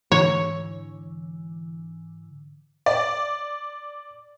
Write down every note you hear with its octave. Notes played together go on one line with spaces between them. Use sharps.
G#2 D3 E3 C#5
D5